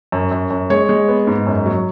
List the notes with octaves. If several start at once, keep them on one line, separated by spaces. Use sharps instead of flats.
F#2
F#2
F#2
G#3 C#5
G#3
B3
G#2
F#2
F#3